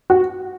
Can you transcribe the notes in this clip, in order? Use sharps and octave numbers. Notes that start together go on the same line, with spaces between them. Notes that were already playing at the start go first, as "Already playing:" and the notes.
F#4